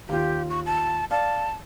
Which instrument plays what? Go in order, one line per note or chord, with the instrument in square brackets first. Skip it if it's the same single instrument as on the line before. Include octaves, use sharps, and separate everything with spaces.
[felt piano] D#2 F4 [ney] G4
[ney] C#6
A5
[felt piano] D5 F5 [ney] A5